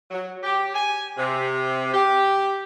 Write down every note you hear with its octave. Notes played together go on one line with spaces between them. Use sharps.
F#3
G4
G#5
C3
G4